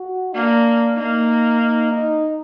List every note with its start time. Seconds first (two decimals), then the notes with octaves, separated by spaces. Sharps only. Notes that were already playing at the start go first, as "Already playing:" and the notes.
Already playing: F#4
0.34 A#3 D4
0.97 A#3 D#4
1.60 D#4
1.92 D#4